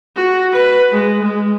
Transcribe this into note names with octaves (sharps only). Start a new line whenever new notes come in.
F#4
B4
G#3
G#3